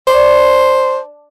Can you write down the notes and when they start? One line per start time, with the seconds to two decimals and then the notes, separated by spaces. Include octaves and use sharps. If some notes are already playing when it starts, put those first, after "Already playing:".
0.07 D4 C5